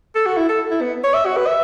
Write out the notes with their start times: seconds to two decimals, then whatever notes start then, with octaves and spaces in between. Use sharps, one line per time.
0.15 A4
0.26 F#4
0.37 E4
0.49 A4
0.71 E4
0.82 B3
1.04 C#5
1.14 E5
1.26 F#4
1.37 B4
1.47 E5